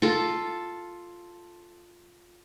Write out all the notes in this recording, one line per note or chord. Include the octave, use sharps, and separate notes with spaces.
F4 A4